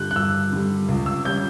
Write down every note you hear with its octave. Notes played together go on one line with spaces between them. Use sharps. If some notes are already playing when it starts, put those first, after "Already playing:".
Already playing: G2 D3 G3 F#6 G6
F#6
G2 E6
D3 G3
C#2
E6
C#3 G3 C#4 G6